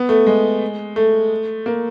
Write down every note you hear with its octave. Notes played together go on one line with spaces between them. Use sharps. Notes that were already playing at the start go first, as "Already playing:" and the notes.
Already playing: B3
A3
G#3
A3
A#3